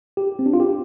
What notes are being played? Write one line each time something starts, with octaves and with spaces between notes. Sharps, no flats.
G4
C4
D4
F4
G4